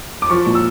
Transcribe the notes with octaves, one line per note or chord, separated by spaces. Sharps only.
D6
F3 C#6
A#2
E6